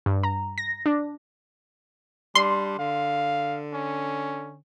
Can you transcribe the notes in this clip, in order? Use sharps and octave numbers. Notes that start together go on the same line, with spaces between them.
G2
A#5
A#6
D4
G3 D4 C6
D3 F5
C#4